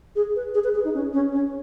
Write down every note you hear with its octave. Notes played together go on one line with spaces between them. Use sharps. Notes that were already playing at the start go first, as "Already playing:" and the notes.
G#4
B4
G#4
B4
G#4
D#4
C#4
C#4
C#4